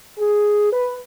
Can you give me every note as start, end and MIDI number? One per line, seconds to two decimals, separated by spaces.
0.18 0.69 68
0.72 0.97 71